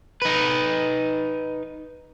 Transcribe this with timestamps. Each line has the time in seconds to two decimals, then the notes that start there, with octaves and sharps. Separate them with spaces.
0.22 D#4 B4